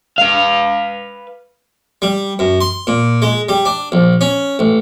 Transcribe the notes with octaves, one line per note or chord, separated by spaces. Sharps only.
B4 F5
G3
F#2
C6
A#2
G#3
G3
D4
A#1
C#4
A1